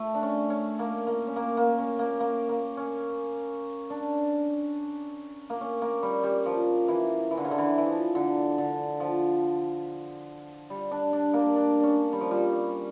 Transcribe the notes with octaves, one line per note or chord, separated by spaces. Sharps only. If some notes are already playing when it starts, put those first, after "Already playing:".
Already playing: A3
D4
C#4
C#4
A#3
A#3
C#4
A#3
A#3
C#4
A#3
A#3
A#3
C#4
D4
A#3
C#4
A#3
G3
G3
F3
E3
E3
D3
C#3
D3
E3
E3
F3
D3
D3
F3
G3
D4
D4
A#3
D4
C#4 D4
G3
F3
G3